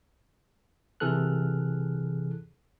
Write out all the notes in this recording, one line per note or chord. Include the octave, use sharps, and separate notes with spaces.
C3 E3 G#4 A4 F6 F#6